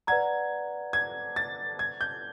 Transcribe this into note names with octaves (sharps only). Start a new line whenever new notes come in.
B4 D5 F#5 A#5 G#6
G#6
A6
G#6
G6